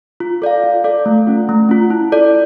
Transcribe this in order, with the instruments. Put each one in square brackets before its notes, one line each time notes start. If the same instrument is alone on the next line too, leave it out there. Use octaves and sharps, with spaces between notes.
[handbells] F4
A4 D5 F5
F4
A4 D5 F5
A3
C#4 F4
A3
C#4 F4
E4
A4 D5